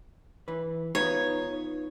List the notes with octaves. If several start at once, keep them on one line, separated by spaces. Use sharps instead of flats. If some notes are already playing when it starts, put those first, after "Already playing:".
E3 B4
B3 D#4 F4 B4 C#5